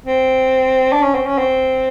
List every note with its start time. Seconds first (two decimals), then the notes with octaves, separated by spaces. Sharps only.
0.05 C4
0.92 D4
1.02 C#4
1.14 C4
1.26 C#4
1.38 C4